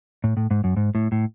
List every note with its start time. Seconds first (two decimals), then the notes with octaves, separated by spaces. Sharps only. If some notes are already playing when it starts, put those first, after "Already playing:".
0.24 A2
0.37 A2
0.51 G#2
0.64 F#2
0.77 G#2
0.95 A2
1.12 A2